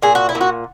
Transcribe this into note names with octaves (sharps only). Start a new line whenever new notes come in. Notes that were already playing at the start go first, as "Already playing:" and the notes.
A#2 G#4
F#4
E4
A#2
F#4